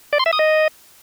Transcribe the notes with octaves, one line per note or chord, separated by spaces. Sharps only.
D5
C6
E5
D#6
D#5